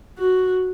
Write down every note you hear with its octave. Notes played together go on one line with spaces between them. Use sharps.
F#4